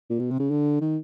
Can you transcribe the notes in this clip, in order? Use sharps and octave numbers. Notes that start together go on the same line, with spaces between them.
A#2
B2
C3
C#3
D3
D#3